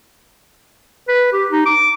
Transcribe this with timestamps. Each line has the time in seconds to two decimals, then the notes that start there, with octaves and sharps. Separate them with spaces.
1.08 B4
1.33 G4
1.51 D#4
1.66 D6